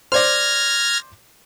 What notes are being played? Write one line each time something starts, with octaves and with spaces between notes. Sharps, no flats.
C5 D5 F6 G#6 A#6